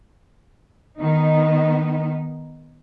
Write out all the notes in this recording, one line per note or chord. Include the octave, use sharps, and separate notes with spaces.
D#3 B3 D#4